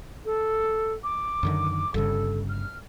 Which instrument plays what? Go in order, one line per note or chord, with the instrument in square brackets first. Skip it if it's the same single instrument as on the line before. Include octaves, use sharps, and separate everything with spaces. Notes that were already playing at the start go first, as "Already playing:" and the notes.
[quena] A4
D6
[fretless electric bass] F#2 D3 D#3
[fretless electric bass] G1 G2 C#3 [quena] A4
[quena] F6